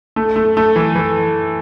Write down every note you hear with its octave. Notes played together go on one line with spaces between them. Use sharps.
A3
A3
A3
E3
E3